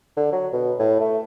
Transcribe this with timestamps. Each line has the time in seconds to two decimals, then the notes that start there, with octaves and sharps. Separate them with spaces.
0.17 D3
0.32 F#3
0.53 B2
0.79 A2
1.00 A3